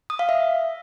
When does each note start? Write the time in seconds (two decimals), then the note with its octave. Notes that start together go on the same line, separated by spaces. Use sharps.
0.10 D#6
0.19 F5
0.29 E5